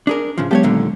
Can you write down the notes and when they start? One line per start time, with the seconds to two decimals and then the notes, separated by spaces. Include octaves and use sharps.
0.07 D4 G#4 A#4
0.38 A2 C#3 F3
0.51 F#3 G#3 B3 G4 A4 C#5
0.63 D#2 A#2 D3